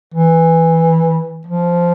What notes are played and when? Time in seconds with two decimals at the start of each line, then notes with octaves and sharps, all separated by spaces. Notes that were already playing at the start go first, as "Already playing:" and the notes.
0.14 E3
1.47 F3